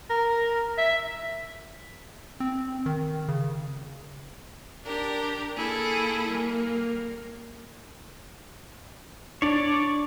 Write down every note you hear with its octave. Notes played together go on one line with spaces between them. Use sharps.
A#4
E5
C4
D#3
C#3
D4 G4 A#4
A#3 E4 G#4 A4
G3 A#3
D4 C#5 D5